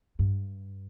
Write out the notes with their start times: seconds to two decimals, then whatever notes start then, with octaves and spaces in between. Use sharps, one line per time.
0.19 G2